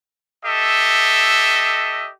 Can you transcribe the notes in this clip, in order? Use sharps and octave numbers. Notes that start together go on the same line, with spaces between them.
G4 A4 D#5 E5